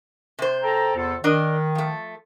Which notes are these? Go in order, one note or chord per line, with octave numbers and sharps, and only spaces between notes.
C3 C5
A4 G5 A#5
E2 F4 A4
D#3 D4 A#4 D#5
F3 A3